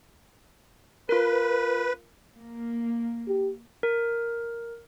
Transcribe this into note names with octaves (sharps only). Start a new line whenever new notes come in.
F4 A#4 B4
A#3
G4
A#4